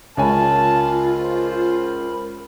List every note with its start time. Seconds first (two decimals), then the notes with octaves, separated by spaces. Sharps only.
0.17 C#2 F4 A#4 C#5 G#5 A5 B5
1.19 C5